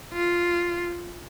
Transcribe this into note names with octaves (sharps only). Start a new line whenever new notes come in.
F4